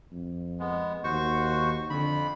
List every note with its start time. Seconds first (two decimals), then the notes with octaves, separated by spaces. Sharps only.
0.12 F2
0.60 G#3 B3
1.04 D#2 F#4 C5 C#6
1.90 F2 D3 B5